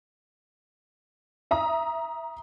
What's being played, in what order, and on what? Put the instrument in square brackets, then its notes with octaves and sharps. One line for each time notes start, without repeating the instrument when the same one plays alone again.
[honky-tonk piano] E5 A#5 D#6